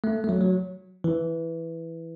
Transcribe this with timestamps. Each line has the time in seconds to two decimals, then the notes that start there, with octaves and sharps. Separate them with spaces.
0.04 A3
0.24 A3
0.29 F#3
0.41 F#3
1.04 E3